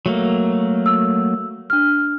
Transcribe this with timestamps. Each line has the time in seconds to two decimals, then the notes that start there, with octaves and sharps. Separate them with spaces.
0.06 F#3 A3 A#3
0.86 E6
1.70 D4 F6